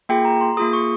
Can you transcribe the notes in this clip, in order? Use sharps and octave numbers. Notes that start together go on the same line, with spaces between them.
A#3 F4 G#4 G5
A#5
C6
A#3 F4 G#4 D#6
C#6